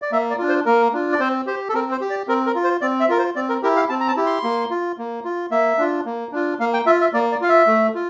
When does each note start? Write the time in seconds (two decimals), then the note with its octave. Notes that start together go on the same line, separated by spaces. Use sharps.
0.02 D5
0.12 A#3 E5
0.30 D5
0.38 D4 F4
0.49 C5
0.66 A#3 A#4
0.93 D4 F4
1.12 D5
1.20 C4 C5
1.47 G4 C5
1.69 A4
1.74 C4 A#4
1.92 C5
2.01 G4
2.10 D5
2.28 C4 A#4
2.46 A#4
2.55 F4
2.64 C5
2.81 C4 D5
3.00 E5
3.09 F4 A#4
3.18 C5
3.35 C4 D5
3.49 A#4
3.63 E4 G4 A#4
3.76 F5
3.89 C4 A5
4.00 A#5
4.08 A5
4.16 E4 G4
4.26 C6
4.44 A#3
4.71 F4
4.98 A#3
5.25 F4
5.51 A#3 E5
5.78 D4 F4
6.06 A#3
6.32 D4 F4
6.59 A#3 F5
6.73 G5
6.86 F4 E5
7.01 E5
7.13 A#3 D5
7.32 D5
7.41 F4 F5
7.49 E5
7.67 A3
7.95 F4